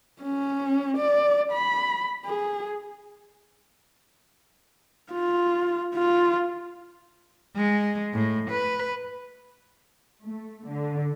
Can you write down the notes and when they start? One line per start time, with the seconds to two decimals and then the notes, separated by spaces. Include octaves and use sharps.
0.21 C#4
0.98 D5
1.52 B5
2.26 G#4
5.13 F4
5.95 F4
7.56 G#3
8.14 A2
8.51 B4
10.24 A3
10.67 D3